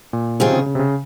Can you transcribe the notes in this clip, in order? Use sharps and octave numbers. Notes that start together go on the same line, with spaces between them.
A#2
C3 D#3 F#3 C4 F4 G#4
C#3
C#3
C3
C#3